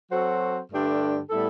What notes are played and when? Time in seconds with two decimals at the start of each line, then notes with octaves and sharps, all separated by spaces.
0.12 F#3 C4 F#4 A4 C5
0.71 G2 D3 A3 D4 G4
1.30 A2 G3 B3 E4 A4